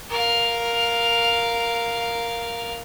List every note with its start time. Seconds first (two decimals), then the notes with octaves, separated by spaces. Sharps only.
0.10 A#4 F5